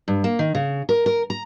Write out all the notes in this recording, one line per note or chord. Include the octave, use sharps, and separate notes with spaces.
G2
A#3
D#3
C#3
A#4
A#4
A#5